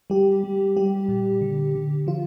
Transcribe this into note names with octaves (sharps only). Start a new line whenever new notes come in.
G3 G4
G3
G3 G4
A#2
D3
D3
F3 F4